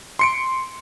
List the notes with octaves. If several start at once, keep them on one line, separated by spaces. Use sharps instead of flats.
C6 C#7 D7